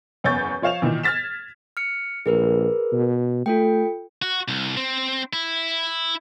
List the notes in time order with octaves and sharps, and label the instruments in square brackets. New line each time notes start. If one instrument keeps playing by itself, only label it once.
[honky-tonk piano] F#1 E2 C#5 C#6 G6 A6
F3 C#5 F5 E7 F7
A#2 D#3 E3
F6 G#6 A6 B6 E7
[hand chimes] F6 C#7
[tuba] A#1 [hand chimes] G#4 A#4 B4
[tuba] B2
[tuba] A3 [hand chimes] F4 A4 G5
[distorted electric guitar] F#4
C2
C4
E4